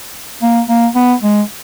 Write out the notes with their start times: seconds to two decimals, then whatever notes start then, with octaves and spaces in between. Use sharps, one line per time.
0.42 A#3
0.69 A#3
0.95 B3
1.23 G#3